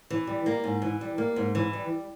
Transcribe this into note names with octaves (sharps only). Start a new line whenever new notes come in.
E3
G3
A#3
G#2
E3
G3
A#3
G#2
E3
G3